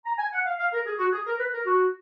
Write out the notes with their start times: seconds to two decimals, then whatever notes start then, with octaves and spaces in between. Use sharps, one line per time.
0.05 A#5
0.18 G#5
0.33 F#5
0.46 F5
0.59 F5
0.73 A#4
0.86 G#4
0.99 F#4
1.13 G#4
1.27 A#4
1.40 B4
1.53 A#4
1.66 F#4